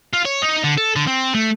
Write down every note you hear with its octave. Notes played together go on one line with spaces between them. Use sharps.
F4
C#5
D#4
D3
A4
D3
C4
A3